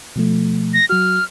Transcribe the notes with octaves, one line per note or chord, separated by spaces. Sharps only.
B2 F3 A3
A#6
F#3 F#4 F6